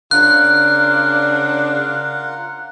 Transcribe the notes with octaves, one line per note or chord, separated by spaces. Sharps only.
C#3 D4 F4 A#4 F#5 F#6